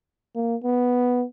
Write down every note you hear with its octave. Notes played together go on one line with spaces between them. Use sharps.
A#3
B3